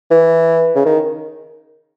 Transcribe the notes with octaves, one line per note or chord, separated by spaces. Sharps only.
E3
C#3
D#3